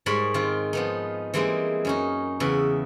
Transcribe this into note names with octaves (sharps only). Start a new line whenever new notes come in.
G#2 G3 A#4 C#5 B5
D#3 C4 F4
F3 B3 D#4
E3 G3 G#3 A#3 C4 D#4
F#2 C#4 D#4
E2 C#3 E4 B4